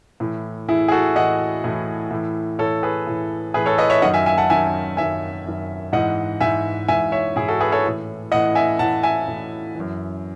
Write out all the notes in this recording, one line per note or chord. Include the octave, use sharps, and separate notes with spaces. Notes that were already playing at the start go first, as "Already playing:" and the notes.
A2 E3
A2 E3 E4 G#4
G#4
F#4 A4
A2 E3 D#5 F#5
A2 E3
A2 E3
A2 E3 A4 C#5
G#4 B4
A2 E3
A2 E3 G#4 B4
A4 C#5
B4 D#5
C#5 E5
F#2 D#3 D#5 F#5
E5 G#5
E5 G#5
F#5 A5
F#2 D#3 E5 G#5
F#2 D#3 E5 G#5
F#2 D#3
G#2 E3 D#5 F#5
G#2 E3 E5 G#5
G#2 E3 E5 G#5
C#5 E5
G#2 E3 E4 G#4
F#4 A4
G#4 B4
A4 C#5
A2 E3
A2 E3 D#5 F#5
E5 G#5
A2 E3 F#5 A5
E5 G#5
A2 E3
F#2 E3